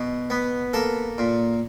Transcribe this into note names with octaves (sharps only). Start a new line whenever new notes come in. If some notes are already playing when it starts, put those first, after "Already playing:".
Already playing: B2
B3
A#3 A4
A#2